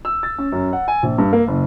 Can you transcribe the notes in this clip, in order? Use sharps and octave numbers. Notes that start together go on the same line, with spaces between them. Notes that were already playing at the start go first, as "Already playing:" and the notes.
E6
A6
C#4
F#2
F#5
G#5
A#1
G2
A#3
F#1